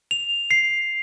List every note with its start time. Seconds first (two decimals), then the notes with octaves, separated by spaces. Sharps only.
0.11 F7
0.51 C7